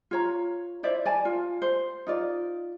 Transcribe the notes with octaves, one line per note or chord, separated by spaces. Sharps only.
F4 C#5 A#5
E4 C5 D5 E5
D5 G#5 A5
F4
C5
D#4 F4 D5